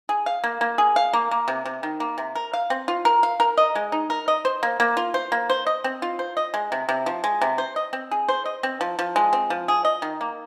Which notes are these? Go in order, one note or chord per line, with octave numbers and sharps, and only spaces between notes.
G#4
F5
A#3
A#3
G#4
F5
A#3
A#3
C3
C3
D#3
A#3
C3
A#4
F5
C4
F4
A#4
F5
A#4
D#5
G#3
D#4
A#4
D#5
C5
A#3
A#3
F4
C5
A#3
C5
D#5
C4
F4
C5
D#5
G#3
C3
C3
F3
G#3
C3
C5
D#5
C4
G#4
C5
D#5
C4
F3
F3
G#3
C4
F3
G#4
D#5
D#3
A#3